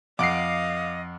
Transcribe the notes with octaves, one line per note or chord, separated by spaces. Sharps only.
F2 D#5 F5 F#5 D6 C7 D7